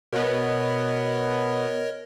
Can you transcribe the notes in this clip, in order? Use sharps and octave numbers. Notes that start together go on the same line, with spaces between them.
B2 B3 A#4 C#5 D#5